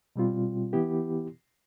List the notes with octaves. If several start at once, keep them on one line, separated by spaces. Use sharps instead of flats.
B2 G3 C4 F4
E3 B3 E4 G4